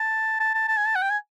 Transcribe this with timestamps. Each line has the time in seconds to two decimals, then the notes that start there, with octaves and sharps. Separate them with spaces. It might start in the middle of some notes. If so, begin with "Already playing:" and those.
Already playing: A5
0.40 A5
0.54 A5
0.68 A5
0.77 G#5
0.87 A5
0.95 F#5
1.02 G5
1.10 G#5